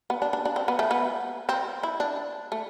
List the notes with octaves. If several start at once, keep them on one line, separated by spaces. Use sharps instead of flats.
B3
D4
D4
D4
C4
B3
A3
B3
C4
E4
D4
A3